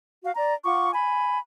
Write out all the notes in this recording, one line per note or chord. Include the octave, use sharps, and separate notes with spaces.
F#4 F5
D5 A#5
F4 F#5 C#6 D6
G#5 B5